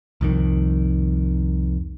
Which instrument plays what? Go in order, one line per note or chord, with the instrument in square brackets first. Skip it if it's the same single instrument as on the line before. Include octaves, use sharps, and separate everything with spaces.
[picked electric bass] C2 F2 D#3